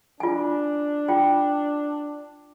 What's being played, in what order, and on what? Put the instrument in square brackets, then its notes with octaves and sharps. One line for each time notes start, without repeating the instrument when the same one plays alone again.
[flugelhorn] D4 [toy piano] F4 G#5
[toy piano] F4 G5